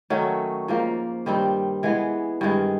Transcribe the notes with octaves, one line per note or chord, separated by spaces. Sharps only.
D#3 F#3 A3 C#4
G#2 F3 A#3
G2 D#3 G3 C4
E3 G#3 B3
G2 D#3 G#3